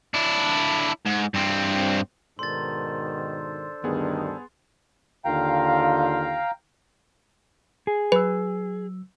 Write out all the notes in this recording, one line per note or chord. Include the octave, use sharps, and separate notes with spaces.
D4 E4
G#2
G2 C4
G#2 B2 D#3 D4 A4 C5 C6 A6
D2 G2 D#3 B3 G#4
D#2 D3 F4 F5 G5 A#5
G#4
F#3 B4 E6